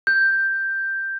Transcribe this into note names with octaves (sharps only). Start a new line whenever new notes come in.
G6